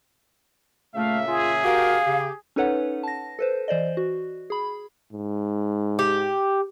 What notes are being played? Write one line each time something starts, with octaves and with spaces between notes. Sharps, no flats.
A#2 C#3 A3 E5 F5
F4 G#4
F#4 G4 A#4 F5
C#3 G4
C#4 D#4 A4 B4 C#5 F#5
A5 A#6
A4 B4 C5
E3 C5 D5 D#5
F#4
G#4 B5
G#2
G4